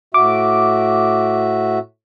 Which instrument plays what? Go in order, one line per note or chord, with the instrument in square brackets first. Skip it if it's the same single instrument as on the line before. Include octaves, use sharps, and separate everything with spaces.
[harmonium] A2 F#4 E5 [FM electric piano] D6